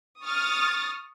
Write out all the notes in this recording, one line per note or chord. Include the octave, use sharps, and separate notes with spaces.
C#6 D#6 F6 A6